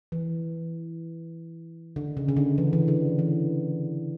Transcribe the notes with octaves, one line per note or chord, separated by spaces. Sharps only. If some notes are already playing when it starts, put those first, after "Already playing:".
E3
D3
C#3
C#3
D3
E3
E3
D3
E3